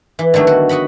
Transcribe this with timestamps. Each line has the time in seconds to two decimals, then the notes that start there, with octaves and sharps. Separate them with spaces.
0.19 E3
0.34 D3 D#3 F#3 A3 B3
0.47 F#4
0.69 F#4 D#5 F#5 B5